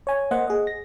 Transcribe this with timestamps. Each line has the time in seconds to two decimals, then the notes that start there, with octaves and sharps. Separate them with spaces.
0.07 C#5 G#5
0.31 A#3 C5 D#5 F#5
0.47 G#4 D#5
0.67 A#6